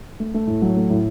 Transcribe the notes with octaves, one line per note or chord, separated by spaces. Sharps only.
A3
A3
A2
F#3
A3
A2